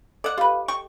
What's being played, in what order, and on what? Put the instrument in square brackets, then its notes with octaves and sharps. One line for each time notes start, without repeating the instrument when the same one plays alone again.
[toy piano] A4 D#5 D6 [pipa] D5 F#5
[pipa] F4 B4 [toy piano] G4
[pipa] G5 C#6